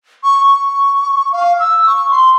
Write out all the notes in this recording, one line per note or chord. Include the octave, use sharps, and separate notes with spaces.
C#6
C#6
F5
E6
C#6
C6